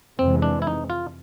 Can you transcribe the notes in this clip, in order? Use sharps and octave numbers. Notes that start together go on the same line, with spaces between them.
F2 C3 E3 G#3 C4
D4
E4
D#4
F4